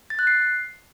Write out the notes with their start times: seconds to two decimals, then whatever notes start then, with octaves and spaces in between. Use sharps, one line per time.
0.10 A6
0.19 F#6
0.27 C7